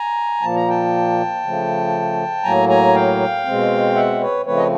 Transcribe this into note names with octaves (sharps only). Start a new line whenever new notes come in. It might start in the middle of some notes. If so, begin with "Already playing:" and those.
Already playing: G#5 A#5
A#2 F3 A#3 A5
A#5
G5 A5
C#3 F3 A3
A2 F#3 A#3 G#5 A#5
G#5 A#5
F5 G5
B2 G#3 C4
E5 F#5
B4 C#5
C#3 F3 A3 C4 B4 C#5
D#5